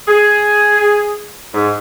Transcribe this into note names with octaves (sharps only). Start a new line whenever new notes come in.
G#4
G#2